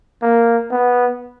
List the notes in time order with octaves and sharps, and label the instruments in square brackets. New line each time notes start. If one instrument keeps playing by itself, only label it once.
[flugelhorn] A#3
B3